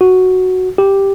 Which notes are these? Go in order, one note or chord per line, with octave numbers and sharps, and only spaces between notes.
F#4
G4